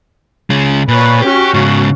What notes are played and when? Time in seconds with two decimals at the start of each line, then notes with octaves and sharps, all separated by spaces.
0.50 C#3 G#3
0.88 A#2 B4 C#5
1.22 C#4 F#4 G4
1.54 G#2 C#3